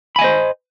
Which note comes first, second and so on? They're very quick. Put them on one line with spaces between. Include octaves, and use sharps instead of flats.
B5 G#5 D#5 C5